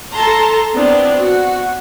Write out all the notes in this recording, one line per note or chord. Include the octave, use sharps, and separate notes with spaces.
A4 A5 A#5 C6
B3 C4 D4 E4
F#4